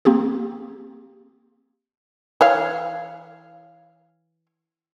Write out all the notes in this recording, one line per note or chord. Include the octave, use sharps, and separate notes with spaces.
A#3 C4 G4 G#4
E3 C#5 F5